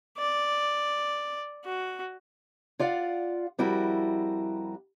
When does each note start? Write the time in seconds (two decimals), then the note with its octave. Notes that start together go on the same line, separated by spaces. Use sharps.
0.18 D5
1.65 F#4
2.79 F4 D5 F5 F#5
3.58 F2 G3 E4 F#4 A#4